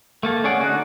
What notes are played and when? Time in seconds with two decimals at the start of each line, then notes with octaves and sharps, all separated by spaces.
0.23 A3 A#3 A4
0.44 C#4 G#4 D5 F#5
0.61 D3 D#4 F#4 F#6